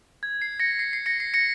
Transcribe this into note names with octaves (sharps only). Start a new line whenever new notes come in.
G#6
C7
A#6 C#7
C7
C7
A#6 C#7
C7
A#6 C#7